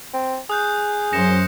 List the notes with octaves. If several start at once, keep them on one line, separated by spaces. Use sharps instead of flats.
C4
G#4 D#6 F#6 G6
F#2 C5 A#6 C#7 E7